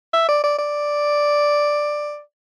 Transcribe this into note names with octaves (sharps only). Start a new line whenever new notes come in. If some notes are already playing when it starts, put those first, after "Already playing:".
E5
D5
D5
D5